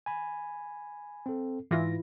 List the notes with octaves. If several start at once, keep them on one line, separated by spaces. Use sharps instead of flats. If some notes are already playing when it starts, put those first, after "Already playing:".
G#5 B5
C4 A4
G#2 E3 E4 F4 B4 A#6